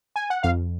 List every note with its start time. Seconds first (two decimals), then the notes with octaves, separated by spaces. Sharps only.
0.16 G#5
0.30 F#5
0.43 F2 F5